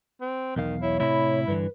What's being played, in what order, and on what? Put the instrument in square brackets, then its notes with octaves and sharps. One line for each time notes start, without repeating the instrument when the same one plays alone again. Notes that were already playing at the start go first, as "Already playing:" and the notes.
[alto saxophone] C4
[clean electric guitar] B1 E2 F5 [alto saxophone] D#3
[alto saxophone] E4 [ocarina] C#5
[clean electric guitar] A2 C3 B5 [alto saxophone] E4
[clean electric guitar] G2 D3 E3 [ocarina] B4